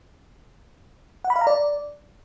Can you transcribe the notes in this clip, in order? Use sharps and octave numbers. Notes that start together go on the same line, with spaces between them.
F#5
B5
F5
A#5
D5